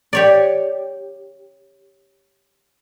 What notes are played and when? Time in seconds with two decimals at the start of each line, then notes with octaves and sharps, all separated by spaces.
0.13 G4 C#5 D5